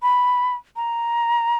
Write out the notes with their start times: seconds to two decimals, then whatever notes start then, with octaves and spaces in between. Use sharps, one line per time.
0.02 B5
0.76 A#5